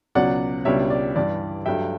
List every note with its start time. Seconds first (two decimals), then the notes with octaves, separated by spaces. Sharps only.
0.15 C#2 B2 F#3 C#4 D5 F#5
0.65 C#2 B2 G3 D4 C#5 E5
0.90 D5
1.15 G2 E3 G3 D5
1.65 G2 F#3 A3 E5 G5